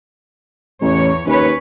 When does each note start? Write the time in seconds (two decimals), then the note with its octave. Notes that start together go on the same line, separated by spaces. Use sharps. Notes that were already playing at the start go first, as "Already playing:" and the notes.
0.82 A1 E2 C#5
1.26 D#2 C#4 B4 C#5